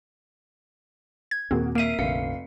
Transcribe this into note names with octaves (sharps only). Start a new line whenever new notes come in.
G#6
D#2 A#2 A#3 C4 F#4 G#4
A#3 A#4 E5 B6 C7 D7 D#7
F1 A#1 D3 F5 C7 C#7